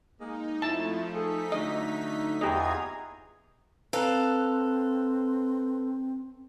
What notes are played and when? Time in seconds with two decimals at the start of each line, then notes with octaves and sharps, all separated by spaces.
0.19 G#3 A#3 D#4
0.62 F2 F3 A3 E4 A5
1.14 D#4 G#4 A4 B6
1.52 D3 F#3 A3 D#5
2.41 E2 F4 G4 G#4 D#5 A#5 G#6
3.93 C4 A4 B4 F5 A#5 F#6